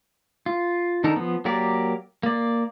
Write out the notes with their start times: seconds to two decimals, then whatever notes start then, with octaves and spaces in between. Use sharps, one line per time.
0.46 F4
1.04 D#3 D4 D#4 A4 A#4
1.16 F3 B3
1.45 F#3 A#3 G4 A#4 D5
2.23 A#3 D5